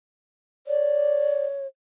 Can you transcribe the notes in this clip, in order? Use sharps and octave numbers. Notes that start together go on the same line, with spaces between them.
C#5 D5